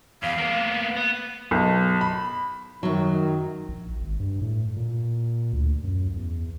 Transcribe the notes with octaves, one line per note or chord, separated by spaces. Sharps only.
E2 F5
A#3 B3
B3
B1
B5
F#2 D#3 F#3
A#1
G#1
G2
A2
A#2
D2
F#2
E2